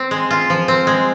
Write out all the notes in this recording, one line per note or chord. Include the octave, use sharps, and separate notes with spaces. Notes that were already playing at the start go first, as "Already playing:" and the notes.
Already playing: C4
G#3
F4
F3
C4
G#3